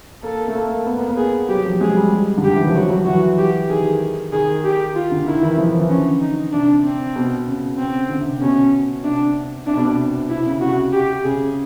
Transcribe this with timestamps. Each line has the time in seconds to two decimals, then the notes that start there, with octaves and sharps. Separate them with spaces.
0.23 A#3 A4
0.48 A3
0.55 A#3
0.86 B3
0.97 A#3
1.08 B3
1.18 G#4
1.49 F#3 G4
1.66 F3
1.81 G#3 G#4
1.96 G3
2.13 G3
2.38 D3
2.44 D#3 G4
2.56 E3
2.66 F3
2.75 F#3 F#4
2.90 F#3
3.07 E3 F#4
3.38 G4
3.70 D#3 G#4
4.32 D#3 G#4
4.64 G4
4.96 F4
5.12 D3
5.27 D#3 E4
5.42 E3
5.58 F3
5.69 E3
5.79 E3
5.89 D3 C#4
6.21 D#4
6.53 C3 D4
6.84 C4
7.16 B2
7.47 C#3
7.78 C4
8.10 D3
8.21 C3
8.41 B2 C#4
9.04 C3 D4
9.67 C3 D4
9.77 B2
9.86 C3
10.30 C3 E4
10.46 C#3
10.61 C3 F#4
10.93 G4
11.24 C#3 G#4